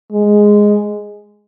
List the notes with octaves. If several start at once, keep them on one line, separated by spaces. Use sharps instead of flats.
G#3